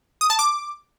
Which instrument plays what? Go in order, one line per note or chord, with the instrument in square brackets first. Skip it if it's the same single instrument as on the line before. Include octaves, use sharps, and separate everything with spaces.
[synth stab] D#6
A5
D6